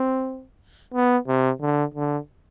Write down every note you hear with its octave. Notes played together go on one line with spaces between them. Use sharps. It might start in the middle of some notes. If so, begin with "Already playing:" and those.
Already playing: C4
B3
C3
D3
D3